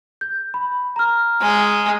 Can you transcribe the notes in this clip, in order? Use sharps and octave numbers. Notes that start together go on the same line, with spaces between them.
G6
B5
A#5 F6
G#3